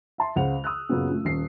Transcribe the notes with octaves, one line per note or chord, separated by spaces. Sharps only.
E5 A5 C6
C#2 C#3 C5 F5 F#5 F7
D#6 E6 F#6
F#2 A#2 C#3 F#3 B3 C#4
A3 C#4 F4
D#1 C#4 C7